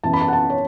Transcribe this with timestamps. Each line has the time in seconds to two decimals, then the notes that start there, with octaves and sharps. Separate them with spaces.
0.04 F#2 E3 B3 A5
0.14 B5
0.21 A5
0.28 F#5
0.33 A5
0.50 C#5